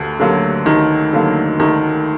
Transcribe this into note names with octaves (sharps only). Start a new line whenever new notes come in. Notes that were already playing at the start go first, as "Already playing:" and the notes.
Already playing: D2 D3
D3 F#3 A#3
D2 D#3
D3 F#3 A#3
D2 D#3